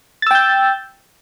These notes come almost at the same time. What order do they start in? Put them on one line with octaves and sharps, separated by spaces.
A6 E6 G5 G6